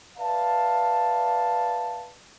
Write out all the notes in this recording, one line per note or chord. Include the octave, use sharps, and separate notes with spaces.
B4 D5 E5 F5 A5